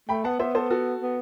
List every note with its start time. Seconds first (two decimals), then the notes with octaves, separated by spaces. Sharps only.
0.09 A3 G5 B5
0.24 B3 F#5 A5
0.39 B3 C5 E5
0.55 A4 C5
0.70 F#4 A4
1.01 B3